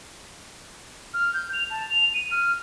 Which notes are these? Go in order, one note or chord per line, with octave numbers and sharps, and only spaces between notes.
F6
G6
F7
A5
F7
D#7
F6